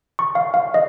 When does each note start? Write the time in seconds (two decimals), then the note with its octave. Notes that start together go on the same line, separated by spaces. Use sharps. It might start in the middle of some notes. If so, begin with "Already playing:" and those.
0.19 C#6
0.35 F5
0.54 F5
0.74 D#5